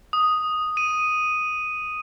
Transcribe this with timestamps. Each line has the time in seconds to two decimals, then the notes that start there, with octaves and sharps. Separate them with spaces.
0.13 D#6
0.77 D#7